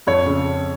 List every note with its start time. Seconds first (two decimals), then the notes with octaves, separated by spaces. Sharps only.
0.07 F2 C#5
0.26 C#3